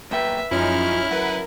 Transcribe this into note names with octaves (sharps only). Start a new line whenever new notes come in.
B1 A#3 B4 E5 G5
F#2 F3 G#3 C#4 D#4 E4 F6
F#2 A#4 B4 F#5